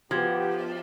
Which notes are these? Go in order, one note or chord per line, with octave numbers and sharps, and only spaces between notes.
F3 B3 F#4 G4 G#6